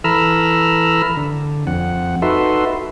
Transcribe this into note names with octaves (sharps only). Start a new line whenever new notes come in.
E3 A4 A#5 B5 E6 F6
D3
F2 F#5
D#4 F#4 A4 B4 E5 C6